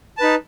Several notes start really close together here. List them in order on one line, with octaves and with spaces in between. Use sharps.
A5 B4 D#4